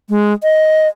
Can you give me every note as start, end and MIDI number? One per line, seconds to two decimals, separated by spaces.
0.09 0.33 56
0.43 0.88 75